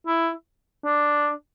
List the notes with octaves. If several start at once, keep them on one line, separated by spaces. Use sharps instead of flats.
E4
D4